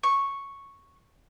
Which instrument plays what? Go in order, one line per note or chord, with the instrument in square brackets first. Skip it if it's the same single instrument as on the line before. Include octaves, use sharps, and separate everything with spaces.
[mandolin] C#6